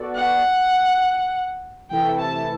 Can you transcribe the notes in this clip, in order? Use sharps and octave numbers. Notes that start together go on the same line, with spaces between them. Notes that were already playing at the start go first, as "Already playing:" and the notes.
Already playing: B3 F#4 A4 D5
F#5
C3 E3 A3 E4 A4 G5
A5